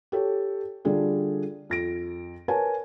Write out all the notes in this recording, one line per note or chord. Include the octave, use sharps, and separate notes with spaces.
G4 A4 C#5
D3 G3 D4 F4 G#4 A4
F2 A#6 D7
A#4 B4 C#5 G#5 A5